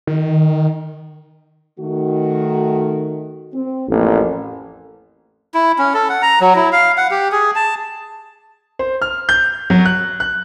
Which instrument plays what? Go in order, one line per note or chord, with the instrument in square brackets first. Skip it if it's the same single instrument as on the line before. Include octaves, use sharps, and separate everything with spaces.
[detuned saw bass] D#3
[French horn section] D#3 A3 F#4
C4
[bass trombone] A1 [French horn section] F2 A#3
[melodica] E4
C#4
A4
F#5
A#5
F#3
E4
F5
F#5
G4
G#4
A5
[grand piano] C5
F6
G6
F#3
F#6
F#6